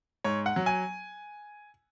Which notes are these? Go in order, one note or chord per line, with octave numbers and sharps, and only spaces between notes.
G#2 C#5
F#5
F#3
G#5